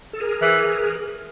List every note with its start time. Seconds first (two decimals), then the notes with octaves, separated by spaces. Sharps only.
0.13 A4
0.20 G#4 A#4
0.42 E3